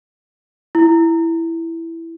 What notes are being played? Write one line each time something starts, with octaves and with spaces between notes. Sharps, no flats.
E4